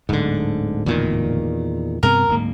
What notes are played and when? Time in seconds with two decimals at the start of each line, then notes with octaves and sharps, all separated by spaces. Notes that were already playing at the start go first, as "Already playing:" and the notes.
0.09 D1 G#2 D3
0.86 E2 A#2 D#3
2.03 G2 C3 B3 A#4
2.29 D1 G#2 A#3